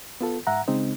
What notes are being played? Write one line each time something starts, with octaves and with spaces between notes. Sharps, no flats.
B3 F4 A4
G#2 E5 F#5 A#5
C#3 G#3 C4 D#4